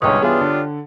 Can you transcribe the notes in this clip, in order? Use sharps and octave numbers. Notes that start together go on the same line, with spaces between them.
G1 C2 G2 G#3 C#4 C#5 G5 D#6
E3 G3 B3 D4 F4 G#4
D3